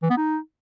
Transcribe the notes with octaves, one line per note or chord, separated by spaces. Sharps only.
E3
B3
D#4